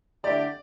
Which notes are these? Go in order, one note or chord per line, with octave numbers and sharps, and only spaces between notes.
D3 A3 E4 G4 D5